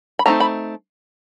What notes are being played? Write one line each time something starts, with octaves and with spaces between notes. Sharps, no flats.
B5
F3 A3 C4 D#4 A#5
B5